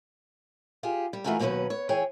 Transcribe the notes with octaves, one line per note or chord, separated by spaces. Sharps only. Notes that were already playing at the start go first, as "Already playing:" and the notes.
F4 G4 G#4
G3
E3 A3 F4 F#4 G#4 A#4
D#2 B2 F#3 A#3 C#4 B4
C#5
E3 G#4 C#5 G5 G#5